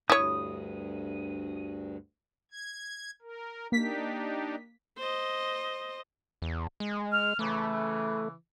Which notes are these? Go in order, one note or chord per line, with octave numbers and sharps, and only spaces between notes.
D2 G2 E4 C#5 D#6
G#6
A#4
A#3 D4 D#4 G4 B6
C5 D#5
E2
G#3
F6
C#3 E3 A3